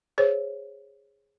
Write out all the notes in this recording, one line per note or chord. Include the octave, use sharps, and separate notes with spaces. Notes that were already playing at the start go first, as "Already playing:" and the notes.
G#4 C5 C#5